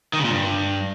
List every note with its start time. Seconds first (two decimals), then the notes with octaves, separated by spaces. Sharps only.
0.13 D#3
0.19 C#3
0.25 A#2
0.30 G2